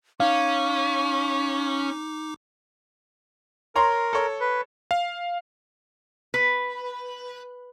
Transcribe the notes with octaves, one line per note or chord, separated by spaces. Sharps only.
C#4 D#4 F5 C#6 D6
A#4 C#5 A#5 C6
A4 C#5
B4
F5
B4